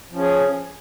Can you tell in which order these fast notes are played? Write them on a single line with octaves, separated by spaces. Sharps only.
F3 C#4 G#4